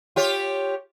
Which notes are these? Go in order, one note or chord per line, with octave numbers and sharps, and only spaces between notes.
F4 G4 C#5